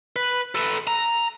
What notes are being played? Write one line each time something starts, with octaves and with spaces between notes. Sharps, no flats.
B4
A4 B4
A#5